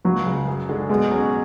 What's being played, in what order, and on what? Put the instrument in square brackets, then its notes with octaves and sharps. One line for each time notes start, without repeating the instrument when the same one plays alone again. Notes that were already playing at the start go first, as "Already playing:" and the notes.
[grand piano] C#2 [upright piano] F#3
[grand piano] C#3 G#3
F#2
D3 G#3
[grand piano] B2 [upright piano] G#3
[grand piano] F#3 C#4